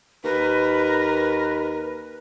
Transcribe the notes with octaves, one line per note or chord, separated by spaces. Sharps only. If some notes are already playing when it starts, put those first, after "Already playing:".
D#2 A#4 B4